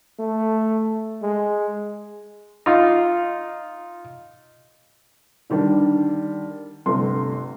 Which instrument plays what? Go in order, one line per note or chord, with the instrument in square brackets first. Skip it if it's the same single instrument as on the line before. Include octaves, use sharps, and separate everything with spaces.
[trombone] A3
G#3
[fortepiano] D#4 F4
[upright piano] D3 D#3 G3 D4
G1 C3 A3 C6